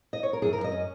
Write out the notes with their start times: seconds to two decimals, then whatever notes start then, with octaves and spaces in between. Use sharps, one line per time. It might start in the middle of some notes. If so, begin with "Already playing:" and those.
0.13 D#5
0.23 C#5
0.33 A#4
0.42 F#2 G#4
0.53 F#2 A#4
0.64 D#5
0.72 C#4